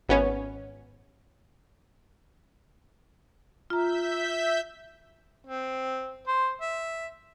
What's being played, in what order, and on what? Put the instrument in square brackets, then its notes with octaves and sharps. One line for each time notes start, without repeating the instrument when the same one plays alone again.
[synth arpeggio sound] G#1 B3 C#4 C#5
[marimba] F4 A#5 [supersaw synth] E5 G6 B6
[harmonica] C4
C5
E5